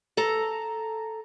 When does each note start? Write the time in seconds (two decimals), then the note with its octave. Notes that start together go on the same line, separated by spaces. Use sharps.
0.17 A4 A#5